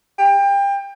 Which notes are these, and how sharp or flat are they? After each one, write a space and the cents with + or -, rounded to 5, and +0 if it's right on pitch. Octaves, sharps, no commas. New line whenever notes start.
G5 +30